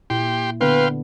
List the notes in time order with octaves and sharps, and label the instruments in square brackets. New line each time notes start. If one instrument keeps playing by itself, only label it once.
[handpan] A#2 E4 [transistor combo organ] G4 G5 C6
[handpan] D3 B3 D4 [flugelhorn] B4 [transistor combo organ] F5 G5 C6